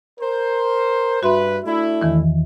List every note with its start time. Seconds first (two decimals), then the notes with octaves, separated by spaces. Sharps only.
0.19 A#4 C5
1.23 G2 F#4 B4 E5 C6
1.64 A3 D4 E4
2.01 E2 D#3 E3